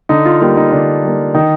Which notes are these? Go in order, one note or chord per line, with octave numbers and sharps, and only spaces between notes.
D3 D#4
F4
G3 A#3 D#4
D#4
D3 D4
G3 A#3
D#3 D#4